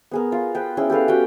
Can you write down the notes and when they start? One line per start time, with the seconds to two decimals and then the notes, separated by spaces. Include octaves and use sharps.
0.11 B3 G#4 A#4
0.32 F4
0.55 B4 G5
0.77 C#4 E4 G#4
0.90 G4 A4 B4 F5
1.08 F#4 G4 G5